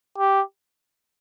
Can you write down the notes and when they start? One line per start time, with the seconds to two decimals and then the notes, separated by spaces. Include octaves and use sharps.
0.18 G4